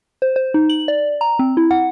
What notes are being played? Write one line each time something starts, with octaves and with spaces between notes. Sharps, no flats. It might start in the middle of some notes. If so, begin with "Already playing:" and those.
C5
C5
D#4
F#7
D5
A#5
C4
E4
F#5